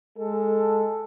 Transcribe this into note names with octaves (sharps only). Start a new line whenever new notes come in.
G#3 A4